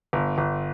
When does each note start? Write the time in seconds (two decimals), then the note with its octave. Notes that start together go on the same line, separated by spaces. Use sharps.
0.13 G1
0.38 G1